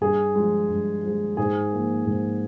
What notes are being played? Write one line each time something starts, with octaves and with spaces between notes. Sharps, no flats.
G2 G#4
F3 G#3
G2
F3 G#3
G#2 G#4
F3 A#3
G#2